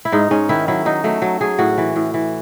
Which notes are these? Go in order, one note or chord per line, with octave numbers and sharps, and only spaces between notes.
E4
G#2 D#4
G#2 C#4
D#3 E4
F#3 E4
F#3 D#4
F#3 A3
F#3
F#3 G#4
A2 F#4
E3
A2
E3